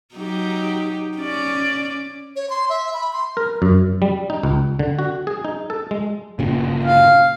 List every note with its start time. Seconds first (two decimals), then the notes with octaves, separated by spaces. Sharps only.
0.15 F#3 D#4 G4
1.18 C#4 D5
2.36 C#5
2.50 C6
2.70 E5
2.94 B5
3.13 C6
3.37 A#4
3.62 F#2
4.02 G3
4.30 D#4
4.43 C#2
4.79 D3
4.99 F#4
5.27 G#4
5.45 D#4
5.70 A4
5.91 G#3
6.39 G1 A#2 C#3
6.85 F5